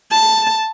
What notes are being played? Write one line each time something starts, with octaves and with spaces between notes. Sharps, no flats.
A5